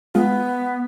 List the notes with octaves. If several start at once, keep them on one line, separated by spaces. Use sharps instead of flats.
G#3 B3 F4